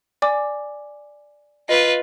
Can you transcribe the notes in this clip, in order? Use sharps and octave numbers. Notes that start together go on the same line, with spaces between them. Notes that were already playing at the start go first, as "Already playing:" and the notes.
D5 G#5 D6
F4 B4 D#5